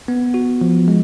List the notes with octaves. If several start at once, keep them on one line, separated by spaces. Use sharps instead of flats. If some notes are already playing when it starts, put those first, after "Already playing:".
B3
F#4
F3
G#3